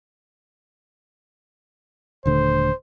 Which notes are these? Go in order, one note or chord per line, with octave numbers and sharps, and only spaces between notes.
D#1 D3 A3 C5